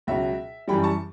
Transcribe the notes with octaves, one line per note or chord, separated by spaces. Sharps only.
C#2 B2 F#3 E5
F#2 E3 G3 G5 B5
A5 C#6